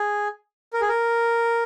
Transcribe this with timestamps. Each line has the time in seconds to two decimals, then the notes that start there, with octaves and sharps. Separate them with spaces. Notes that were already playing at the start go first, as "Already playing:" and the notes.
Already playing: G#4
0.73 A#4
0.81 G#4
0.89 A#4